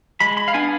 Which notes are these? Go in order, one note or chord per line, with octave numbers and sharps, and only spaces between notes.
G#3 B5
B5
F5
B3 D4 G#5